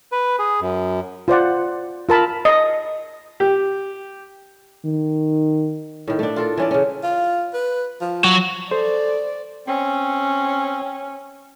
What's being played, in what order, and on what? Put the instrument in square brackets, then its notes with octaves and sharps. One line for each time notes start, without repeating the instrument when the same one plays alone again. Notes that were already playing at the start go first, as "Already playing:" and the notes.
[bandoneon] B4
G#4
F#2
[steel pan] F4 C5 D5 F#5
F4 A#4 A5 B5
D#5
[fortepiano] G4
[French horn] D#3
[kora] A2 D#3
A3 D4
F4 A4 A#4
E3 C#4 D5
C#3 C#4
[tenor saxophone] F4
B4
F3
[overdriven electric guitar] F#3 F#4
[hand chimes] A4 [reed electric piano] C5 [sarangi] D5
[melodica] C4 [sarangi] C#4